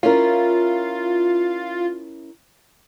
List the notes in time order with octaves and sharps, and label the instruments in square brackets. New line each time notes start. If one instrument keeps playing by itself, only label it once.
[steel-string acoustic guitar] C#4 E4 A#4 [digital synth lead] F4